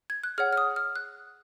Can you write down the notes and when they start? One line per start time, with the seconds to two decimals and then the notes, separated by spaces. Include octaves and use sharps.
0.10 G#6
0.24 F#6
0.38 G#4 C#5 F#5 F6
0.53 F6
0.57 D#6
0.76 F6
0.96 F#6